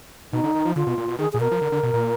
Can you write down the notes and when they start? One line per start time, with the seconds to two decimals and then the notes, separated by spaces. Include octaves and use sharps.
0.33 B2 D#4
0.44 D3
0.55 D#3
0.65 F3
0.76 D3 F4
0.87 B2
0.98 A#2
1.08 B2
1.19 D#3 G#4
1.32 A#2 G#4
1.40 B2 A#4
1.52 F3
1.61 D3
1.72 D3
1.83 B2
1.94 A#2